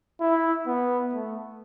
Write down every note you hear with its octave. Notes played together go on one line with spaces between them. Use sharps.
E4
B3
A3